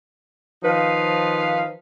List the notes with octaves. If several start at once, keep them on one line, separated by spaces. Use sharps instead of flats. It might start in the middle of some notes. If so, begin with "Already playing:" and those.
D#3 F3 D#4 B4 F5